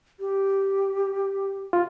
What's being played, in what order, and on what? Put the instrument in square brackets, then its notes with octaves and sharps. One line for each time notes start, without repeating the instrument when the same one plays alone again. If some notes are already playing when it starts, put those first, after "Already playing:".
[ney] G4
[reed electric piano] F4